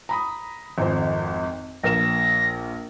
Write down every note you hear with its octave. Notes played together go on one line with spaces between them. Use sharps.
A#5 B5 D#6
G#1 F2 C5
A#1 A#4 A#6 E7